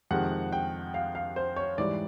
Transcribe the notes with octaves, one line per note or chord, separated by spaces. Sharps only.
F2 C3 D#3 G#3 F#5
G5
F5
F5
C5
C#5
G#2 E3 G3 D5